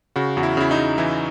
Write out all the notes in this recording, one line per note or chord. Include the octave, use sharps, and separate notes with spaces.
C#3 F#4
E2 F#4
E4
C#3 E4
D#4
C#3
E3 E4